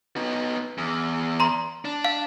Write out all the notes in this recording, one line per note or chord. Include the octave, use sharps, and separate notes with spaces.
B3 D#4
E2
A#5 C6
D4
F5